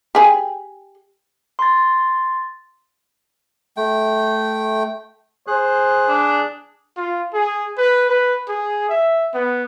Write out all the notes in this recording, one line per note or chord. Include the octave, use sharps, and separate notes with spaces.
G4 G#4
C6 A6
A3 G5
G#4 C5 F#6
D4
F4
G#4
B4
B4
G#4
E5
B3